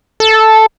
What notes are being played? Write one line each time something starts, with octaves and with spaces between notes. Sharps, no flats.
A4